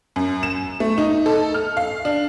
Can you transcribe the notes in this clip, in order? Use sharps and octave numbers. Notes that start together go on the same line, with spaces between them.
F#2
E7
A3
D#4
A4
F6
F5
D4